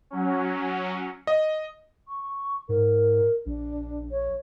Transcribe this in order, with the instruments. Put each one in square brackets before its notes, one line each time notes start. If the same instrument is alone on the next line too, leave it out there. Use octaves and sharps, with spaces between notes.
[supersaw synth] F#3 C#4
[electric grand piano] D#5
[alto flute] C#6
[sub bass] G#2 [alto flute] A#4
[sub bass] A#1 [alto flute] D4
[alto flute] C#5